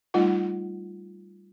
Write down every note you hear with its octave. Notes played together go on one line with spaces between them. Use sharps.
G3 A3 D#4 F4 F#5